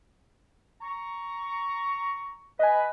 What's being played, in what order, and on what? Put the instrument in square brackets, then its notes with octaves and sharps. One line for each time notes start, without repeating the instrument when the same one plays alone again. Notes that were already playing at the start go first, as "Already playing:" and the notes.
[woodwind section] A#5 C#6
[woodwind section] B4 [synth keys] D#5 G#5